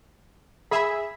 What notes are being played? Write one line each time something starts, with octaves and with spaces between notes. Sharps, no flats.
G#4 E5 B5